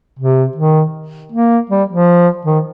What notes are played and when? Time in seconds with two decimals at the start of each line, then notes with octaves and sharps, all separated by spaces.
0.19 C3
0.56 D#3
1.32 A#3
1.70 G3
1.88 F3
2.45 D#3